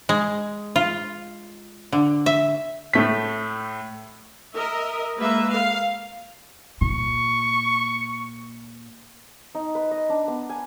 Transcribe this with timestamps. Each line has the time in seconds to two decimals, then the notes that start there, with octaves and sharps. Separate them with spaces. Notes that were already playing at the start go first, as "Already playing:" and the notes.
0.09 G#3
0.76 F4
1.92 D3
2.26 E5
2.93 A2 A3 B6
4.56 A#4 D#5 E5
5.18 G#3 A#3 B4 E5
5.52 F5
6.81 A#2 C#6
9.55 D#4
9.75 B4
9.91 D#5
10.09 D4
10.28 B3
10.50 G#5